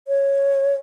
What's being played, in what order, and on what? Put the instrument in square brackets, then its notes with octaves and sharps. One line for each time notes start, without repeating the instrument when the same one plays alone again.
[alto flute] C#5